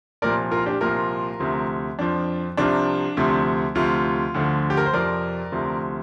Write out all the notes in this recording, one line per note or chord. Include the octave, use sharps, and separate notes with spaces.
C2 A#2 F3 A#4 D5
F4 A#4
D4 G4
C2 A#2 F3 F4 A#4
D2 C3 F3
F2 F3 D4
C2 C3 F3 D4
D2 C3 F3
D2 C3 F3 F4
D2 D3 F3
G4
A#4
C5
F2 C3 F3 A#4 D5
D2 C3 F3